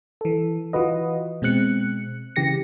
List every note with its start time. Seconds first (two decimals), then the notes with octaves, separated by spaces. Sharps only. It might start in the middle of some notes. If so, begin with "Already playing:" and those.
0.21 E3 A4
0.73 E3 F4 F#4 B4 D#5
1.42 B2 G#3 C4 F#6 C#7
2.36 C#3 E3 G4 A#6 C#7